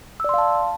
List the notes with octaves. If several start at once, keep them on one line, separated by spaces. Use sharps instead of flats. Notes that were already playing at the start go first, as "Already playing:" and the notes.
D5 F5 A5 C6 E6